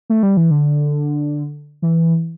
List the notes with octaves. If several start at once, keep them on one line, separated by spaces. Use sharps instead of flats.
A3
G3
E3
D3
E3